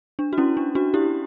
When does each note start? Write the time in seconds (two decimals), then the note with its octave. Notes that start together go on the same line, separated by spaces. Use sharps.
0.19 D4
0.33 F#4
0.38 C#4 E4
0.57 D4
0.75 D4 F#4
0.94 E4 G4